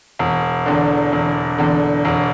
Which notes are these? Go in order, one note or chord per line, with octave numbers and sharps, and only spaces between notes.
E1
E2 D3
E1
E2 D3
E1